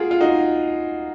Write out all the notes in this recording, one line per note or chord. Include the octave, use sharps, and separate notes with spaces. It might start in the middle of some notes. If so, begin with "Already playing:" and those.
Already playing: F4 F#4 G#4 A#4
F4
D#4 F#4